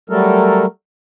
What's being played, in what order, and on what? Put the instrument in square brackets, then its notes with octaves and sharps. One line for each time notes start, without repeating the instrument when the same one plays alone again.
[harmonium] F#3 G3 A3 A4 A#4